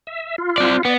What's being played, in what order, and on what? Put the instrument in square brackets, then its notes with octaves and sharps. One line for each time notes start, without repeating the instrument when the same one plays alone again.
[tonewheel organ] E5
F4
[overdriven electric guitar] C4 D5
[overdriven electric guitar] B3 [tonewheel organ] D5